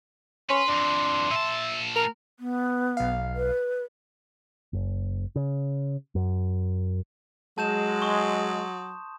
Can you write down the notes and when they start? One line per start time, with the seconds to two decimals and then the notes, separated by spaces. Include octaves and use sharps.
0.50 C#4 B4 C6
0.68 F2 E3 D4
1.31 A#2 E5 A5
1.96 A#4
2.40 B3
2.97 B1 F5
3.35 B4
4.73 F#1
5.36 C#3
6.15 F#2
7.58 F#3 G#3 A5 G6 E7
8.02 C6 C#6 D#6